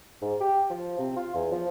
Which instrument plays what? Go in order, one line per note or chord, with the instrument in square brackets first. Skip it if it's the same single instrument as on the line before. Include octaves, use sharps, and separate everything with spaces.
[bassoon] G#2
G4
F3
C3
F4
E2
F3